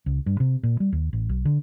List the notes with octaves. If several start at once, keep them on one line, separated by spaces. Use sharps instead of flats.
C#2
G2
C3
A#2
G3
D#2
A1
B1
D3